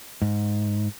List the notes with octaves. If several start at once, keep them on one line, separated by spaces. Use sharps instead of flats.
G#2